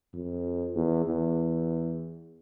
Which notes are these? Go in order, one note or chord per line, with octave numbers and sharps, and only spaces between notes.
F2
E2
E2